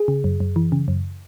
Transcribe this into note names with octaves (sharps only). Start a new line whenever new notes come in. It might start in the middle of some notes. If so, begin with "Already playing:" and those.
Already playing: G#4
C#3
F#2
F#2
E3
C#3
F#2